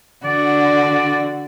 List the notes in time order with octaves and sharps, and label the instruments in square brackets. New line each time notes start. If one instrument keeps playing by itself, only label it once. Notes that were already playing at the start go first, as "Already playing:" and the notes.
[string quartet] D3 F#4 [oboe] D5